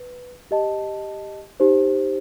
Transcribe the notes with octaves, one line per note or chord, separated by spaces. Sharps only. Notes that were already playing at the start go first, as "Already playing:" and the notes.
Already playing: B4
G4 D#5 A5
D#4 G4 C5